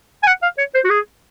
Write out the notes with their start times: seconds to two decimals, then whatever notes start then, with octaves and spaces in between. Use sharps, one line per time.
0.23 G#5
0.27 F#5
0.42 F5
0.58 C#5
0.75 C5
0.84 F#4
0.90 G#4